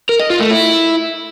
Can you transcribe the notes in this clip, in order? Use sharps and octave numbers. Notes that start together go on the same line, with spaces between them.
A#4
D#5
F4
A3
E4